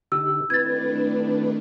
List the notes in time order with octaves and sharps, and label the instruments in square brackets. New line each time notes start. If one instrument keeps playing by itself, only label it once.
[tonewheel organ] D3 D#4 G4 [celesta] E6
[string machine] D#3 A3 D4 [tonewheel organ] C4 E4 B4 [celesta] G#6 A6